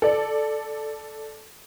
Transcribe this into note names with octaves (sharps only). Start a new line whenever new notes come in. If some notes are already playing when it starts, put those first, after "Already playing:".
A4 D5